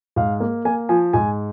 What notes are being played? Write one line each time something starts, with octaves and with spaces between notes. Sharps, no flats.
G#2 F5
A#3
A#3 G#5
F3 G#5
G#2 G#5